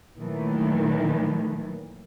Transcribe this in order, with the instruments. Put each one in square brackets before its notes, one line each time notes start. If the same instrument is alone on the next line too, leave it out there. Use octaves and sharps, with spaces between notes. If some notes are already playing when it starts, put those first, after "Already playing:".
[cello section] A#2 D#3 E3 F#3 A3